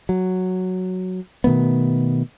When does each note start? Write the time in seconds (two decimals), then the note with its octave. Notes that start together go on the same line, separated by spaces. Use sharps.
0.09 F#3
1.44 B2 D#3 A3 B3